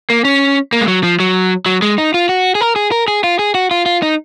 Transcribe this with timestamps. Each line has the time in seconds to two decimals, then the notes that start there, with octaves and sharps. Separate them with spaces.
0.10 A#3
0.25 C#4
0.73 A#3
0.81 G#3
0.88 F#3
1.03 F3
1.20 F#3
1.66 F#3
1.82 G#3
1.98 D#4
2.14 F4
2.29 F#4
2.55 G#4
2.61 A#4
2.76 G#4
2.91 A#4
3.08 G#4
3.24 F4
3.39 G#4
3.55 F#4
3.71 F4
3.86 F4
4.02 D#4